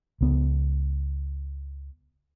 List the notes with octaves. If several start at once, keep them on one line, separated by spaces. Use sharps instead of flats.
C#2 B3